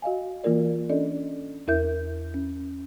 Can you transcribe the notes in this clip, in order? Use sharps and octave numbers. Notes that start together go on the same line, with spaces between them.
F#4 D#5 F5 G#5
E3 A#3 F4 A#4 D5
C#4 D4 A4 D5 D#5
E2 E4 A#4 E5 G6
C#4